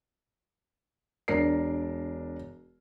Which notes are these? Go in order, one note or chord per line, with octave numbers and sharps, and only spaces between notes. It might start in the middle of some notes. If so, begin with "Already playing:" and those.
E1 D4 A#4 C7